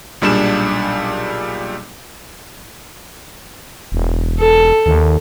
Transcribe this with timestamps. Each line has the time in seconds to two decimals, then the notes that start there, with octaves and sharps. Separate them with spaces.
0.22 B1 A#2 G3 D4 G#4 E7
3.92 E1
4.40 A4
4.86 D#2